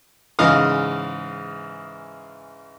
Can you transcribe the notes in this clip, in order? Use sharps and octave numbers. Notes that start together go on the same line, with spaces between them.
G#2 C#3 E3 D#5 F5 D#6